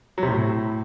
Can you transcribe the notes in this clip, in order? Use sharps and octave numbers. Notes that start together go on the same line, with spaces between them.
F#3
C3
A2